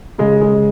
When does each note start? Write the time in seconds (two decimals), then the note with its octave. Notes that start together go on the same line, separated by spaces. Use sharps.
0.18 C#3 G#3
0.41 G#3